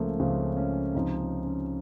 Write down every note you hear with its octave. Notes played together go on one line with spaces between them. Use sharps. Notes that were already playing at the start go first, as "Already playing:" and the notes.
Already playing: C#2 C#3 F3 A3 A#3
C#2 C#3 F3 C4
C#4
C#2 C3 F3 D#4
C#4
C#4